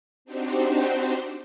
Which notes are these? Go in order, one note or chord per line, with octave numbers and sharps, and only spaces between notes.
C4 D4 D#4 F#4 G4 C5